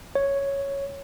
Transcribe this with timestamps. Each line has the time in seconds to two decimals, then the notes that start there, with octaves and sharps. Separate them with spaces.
0.15 C#5